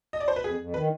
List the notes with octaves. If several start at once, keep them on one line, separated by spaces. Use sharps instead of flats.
D#5
D5
C5
B4
F2 G#4
F2
D#3 B4